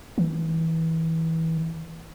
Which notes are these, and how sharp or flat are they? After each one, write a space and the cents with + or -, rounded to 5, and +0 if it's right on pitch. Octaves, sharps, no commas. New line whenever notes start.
E3 -25